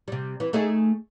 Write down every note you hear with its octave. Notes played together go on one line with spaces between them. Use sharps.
C3 G3
E3
A3 D#4 G#4